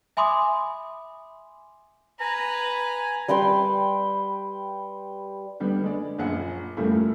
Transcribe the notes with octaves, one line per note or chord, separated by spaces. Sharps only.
E5 G#5 B5 C6 D6 D#6
B4 G#5 A#5
G3 B4 G5 C6
D3 G3 B3
D3 G#3 D5
A#1 F#2 A#2 G#4 F#5 G#5
A2 C#3 F3 G3 A3 A#3